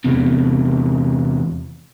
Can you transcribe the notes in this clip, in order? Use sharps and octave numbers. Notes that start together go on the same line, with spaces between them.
E2 C3